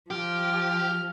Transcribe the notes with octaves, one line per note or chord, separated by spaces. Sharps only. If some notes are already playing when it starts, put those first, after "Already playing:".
F3 G4 F6